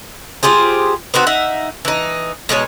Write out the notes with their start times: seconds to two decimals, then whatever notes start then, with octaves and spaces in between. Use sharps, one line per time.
0.43 F4 G4 G#4 C5
1.14 B3 C4 D#4 F#4
1.27 D#4 E5 F#5
1.85 E3 D#4
2.49 B2 G#3 D#4 C#5